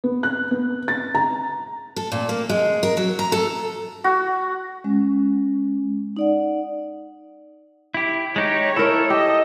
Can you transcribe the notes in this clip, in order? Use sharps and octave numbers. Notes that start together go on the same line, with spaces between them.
B3
F#6
B3
A6
A#5
A4
A#2
A#3
G#3
A#4
F#3
A#5
A4
F#4
G#3 C#4
D#4 D5 F#5
E4 G4
G#3 D#4 G4 C#5
E4 A4 A#4
G4 D#5